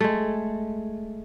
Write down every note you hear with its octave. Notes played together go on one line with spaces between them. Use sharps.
G#3 A3